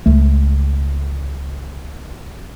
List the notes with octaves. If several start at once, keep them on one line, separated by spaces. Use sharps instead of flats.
C#2 A3